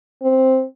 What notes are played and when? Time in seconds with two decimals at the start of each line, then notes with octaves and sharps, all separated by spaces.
0.23 C4